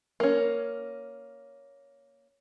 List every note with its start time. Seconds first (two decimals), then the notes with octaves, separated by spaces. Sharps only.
0.20 A#3 C#4